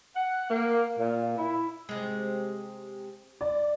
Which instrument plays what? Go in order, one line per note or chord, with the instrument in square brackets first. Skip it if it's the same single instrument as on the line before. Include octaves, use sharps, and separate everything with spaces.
[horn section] F#5
A#3
A#2
E4
[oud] C3 G#3
[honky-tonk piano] D5